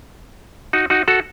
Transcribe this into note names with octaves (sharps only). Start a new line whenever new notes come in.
D#4 F#4
D#4 F#4
F#4 A4